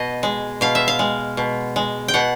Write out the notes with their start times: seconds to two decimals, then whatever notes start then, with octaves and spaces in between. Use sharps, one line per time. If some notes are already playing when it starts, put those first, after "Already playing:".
Already playing: B2 D#5
0.23 G#3
0.61 B2 F5
0.75 E5
0.88 F5
0.99 G#3
1.37 B2
1.76 G#3
2.08 G5
2.14 B2 F#5